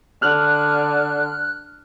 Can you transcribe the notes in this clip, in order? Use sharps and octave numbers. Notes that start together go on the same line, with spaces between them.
D3 F6 F#6